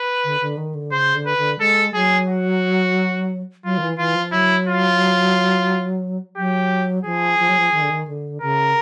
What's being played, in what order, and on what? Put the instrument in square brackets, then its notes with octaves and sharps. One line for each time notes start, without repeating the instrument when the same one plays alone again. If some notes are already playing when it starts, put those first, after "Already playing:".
Already playing: [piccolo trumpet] B4
[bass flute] D3
D3
D#3
D3
[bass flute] C#3 [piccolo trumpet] C5
[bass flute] D3
[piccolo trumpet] B4
[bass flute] D3
[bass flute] G#3 [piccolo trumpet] A4
[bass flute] F#3 [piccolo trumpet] G#4
[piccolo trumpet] F#4
[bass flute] F#3 [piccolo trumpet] F4
[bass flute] D#3
E3
[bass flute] E3 [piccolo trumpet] F4
[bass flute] F3
[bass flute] F#3 [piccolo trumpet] E4
[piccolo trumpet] F4
[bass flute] F#3 [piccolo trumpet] G4
[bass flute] F3 [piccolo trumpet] G#4
[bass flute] F3
F#3
F3
D#3
D3
D#3
D3
[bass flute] C#3 [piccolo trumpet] A#4